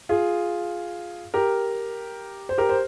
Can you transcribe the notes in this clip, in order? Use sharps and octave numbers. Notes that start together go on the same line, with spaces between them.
F4 G#4
G4 A#4
C5
G4 A#4
C5